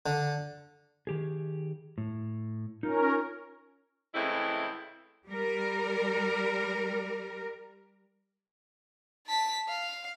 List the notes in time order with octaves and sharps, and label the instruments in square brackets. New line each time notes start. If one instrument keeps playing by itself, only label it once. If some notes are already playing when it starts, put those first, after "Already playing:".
[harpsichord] D3
[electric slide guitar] D#3 G4 G#4
A2
[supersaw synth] C#4 A#4 [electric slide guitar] D#4 F4
[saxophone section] A2 C#3 E3 G#3 C4 E4
[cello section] G3 A#4
[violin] A5 B6
F5